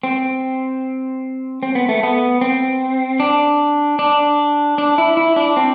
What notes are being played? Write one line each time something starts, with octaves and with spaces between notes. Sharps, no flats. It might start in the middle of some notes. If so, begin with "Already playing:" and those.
C4
C4
B3
A3
B3
C4
D4
D4
D4
E4
E4
D4
C4